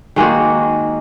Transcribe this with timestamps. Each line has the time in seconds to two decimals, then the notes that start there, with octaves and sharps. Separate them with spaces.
0.16 D#3 G#3 A#3 F#4